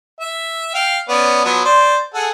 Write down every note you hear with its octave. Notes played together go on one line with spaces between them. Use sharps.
E5
F5 G5
B3 C#4 D5
F3 F#3 B3
C5 D5
G#4 A4 F#5